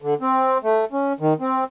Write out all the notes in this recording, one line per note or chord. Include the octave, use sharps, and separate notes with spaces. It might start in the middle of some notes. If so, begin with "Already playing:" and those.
D3
C4
A3
C#4
D#3
C4